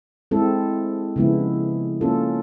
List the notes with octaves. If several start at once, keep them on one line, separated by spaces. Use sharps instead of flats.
G#3 C4 E4 A4
C#3 F3 G#3 B3 E4
A#3 C#4 F4 A4